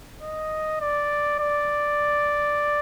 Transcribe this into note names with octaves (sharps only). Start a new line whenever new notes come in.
D#5
D5
D5